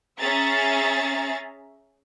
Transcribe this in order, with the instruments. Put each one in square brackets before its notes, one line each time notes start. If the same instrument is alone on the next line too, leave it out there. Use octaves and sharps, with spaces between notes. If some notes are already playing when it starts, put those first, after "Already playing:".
[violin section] C#4 G#4 E5 A#5 A6